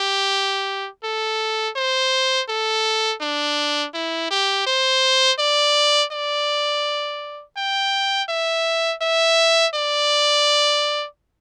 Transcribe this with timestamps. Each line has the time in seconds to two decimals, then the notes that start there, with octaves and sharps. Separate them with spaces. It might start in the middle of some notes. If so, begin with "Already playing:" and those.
Already playing: G4
1.04 A4
1.76 C5
2.49 A4
3.21 D4
3.94 E4
4.31 G4
4.67 C5
5.39 D5
6.12 D5
7.57 G5
8.29 E5
9.02 E5
9.75 D5